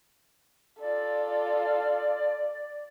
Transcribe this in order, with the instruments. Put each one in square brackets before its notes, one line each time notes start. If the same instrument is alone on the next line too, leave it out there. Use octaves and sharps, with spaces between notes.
[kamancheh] F4 A4 [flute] D5